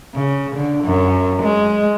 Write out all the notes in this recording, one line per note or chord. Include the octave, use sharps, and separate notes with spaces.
C#3
D3
F#2
G#3